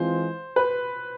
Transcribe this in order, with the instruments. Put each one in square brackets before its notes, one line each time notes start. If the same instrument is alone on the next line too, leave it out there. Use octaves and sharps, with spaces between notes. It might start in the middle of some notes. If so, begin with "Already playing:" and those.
Already playing: [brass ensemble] E3 G#3 C4 F4 [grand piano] C5
[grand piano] B4